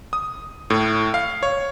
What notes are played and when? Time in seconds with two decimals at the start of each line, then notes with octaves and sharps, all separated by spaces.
0.13 D#6
0.70 A2
1.14 F5
1.43 C#5